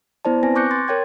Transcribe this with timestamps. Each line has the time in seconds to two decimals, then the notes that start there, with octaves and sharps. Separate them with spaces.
0.25 B3 E4 C5 D5 A5
0.43 C4 B4 G#5 A#6
0.55 C#6 D6 F#6 G6 A#6 C#7
0.71 C6 A6
0.88 A#4 C#5 G5 G#6